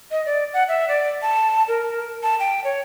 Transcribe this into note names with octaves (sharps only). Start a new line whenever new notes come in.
D#5
D5
F#5
E5
D5
A5
A#4
A5
G5
C#5